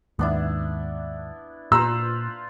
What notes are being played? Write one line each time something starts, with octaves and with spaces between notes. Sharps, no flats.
D#2 G#2 B3 D4 E4
A#2 F4 B4 C5 A#5 E6